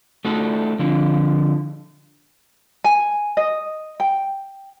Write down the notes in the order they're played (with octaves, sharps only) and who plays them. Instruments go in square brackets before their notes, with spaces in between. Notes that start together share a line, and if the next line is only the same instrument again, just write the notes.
[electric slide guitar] A3 D#4 F#4 A4
D3 F3
[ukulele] G#5
D#5
G5